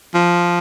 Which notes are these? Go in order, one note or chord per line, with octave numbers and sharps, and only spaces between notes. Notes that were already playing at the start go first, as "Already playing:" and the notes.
F3